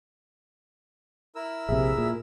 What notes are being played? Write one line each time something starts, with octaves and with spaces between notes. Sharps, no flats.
E4 A#4 E6
A#1 C3 G#4 E5
A#2